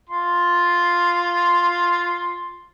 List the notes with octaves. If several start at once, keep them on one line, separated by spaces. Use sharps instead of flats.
F4 C6